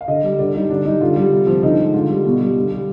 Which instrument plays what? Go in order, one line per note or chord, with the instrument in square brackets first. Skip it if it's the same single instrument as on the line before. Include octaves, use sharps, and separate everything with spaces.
[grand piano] F5
D3 D#5
G3
D3 D5
G3 D#4
D3 D4
G3 D#4
D3 F4
G3
C3
F3
D3 D#4
G#3
D3 F4
G3
B2
G3
D3
G3